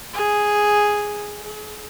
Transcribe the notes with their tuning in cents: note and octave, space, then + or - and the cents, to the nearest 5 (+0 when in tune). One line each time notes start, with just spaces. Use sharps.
G#4 +0
G#4 +35